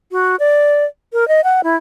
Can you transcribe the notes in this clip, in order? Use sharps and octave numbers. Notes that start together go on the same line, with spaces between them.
F#4
D5
A#4
D#5
F#5
E4